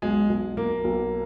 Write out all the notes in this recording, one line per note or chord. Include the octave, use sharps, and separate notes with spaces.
B1 G#3
B1
B1 A#3
B1